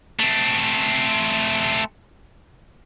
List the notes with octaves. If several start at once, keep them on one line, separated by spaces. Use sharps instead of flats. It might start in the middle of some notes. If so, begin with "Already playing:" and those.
A3 C4